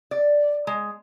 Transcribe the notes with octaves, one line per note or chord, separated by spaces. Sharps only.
D5
G#3